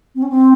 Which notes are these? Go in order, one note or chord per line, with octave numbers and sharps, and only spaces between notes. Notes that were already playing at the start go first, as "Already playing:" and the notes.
C4
C#4
C4